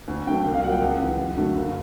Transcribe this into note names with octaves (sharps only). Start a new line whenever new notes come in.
D2
D3 F#3 A3 G5
C2
F5
A#2 F#3 A#3 F#5
G5
C#2 F#5
C#3 E3
F#2 F#5
D3 F#3 A3
F#1